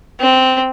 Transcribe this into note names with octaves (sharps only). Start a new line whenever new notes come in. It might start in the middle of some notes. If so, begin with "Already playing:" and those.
C4